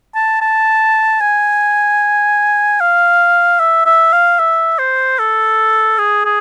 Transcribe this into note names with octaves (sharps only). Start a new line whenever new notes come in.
A5
A5
G#5
F5
E5
E5
F5
E5
C5
A4
G#4
G#4